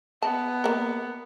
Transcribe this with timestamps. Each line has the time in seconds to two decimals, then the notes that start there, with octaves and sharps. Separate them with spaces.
0.22 B3 A5
0.64 A#3 A#4